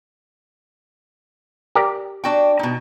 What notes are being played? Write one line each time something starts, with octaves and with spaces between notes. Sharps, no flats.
G4 A#4 D5
D4 F#4 G5
B2 D#4